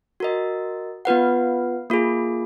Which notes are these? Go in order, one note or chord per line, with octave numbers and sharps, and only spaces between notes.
F#4 A#4 D#5
B3 F4 B4 F#5
A#3 F4 G#4